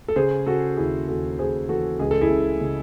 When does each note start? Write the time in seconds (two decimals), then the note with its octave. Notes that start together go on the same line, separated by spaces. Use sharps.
0.08 A4
0.16 C#3 G#4 C5
0.46 C#3 F#4 A4
0.77 D#2 E4 G#4
1.08 D#2 F#4 A4
1.38 D#2 G#4 C5
1.69 E3 F#4 A4
1.99 C#2 G#4
2.11 A4
2.21 E4 G#4
2.30 C#3
2.61 C#3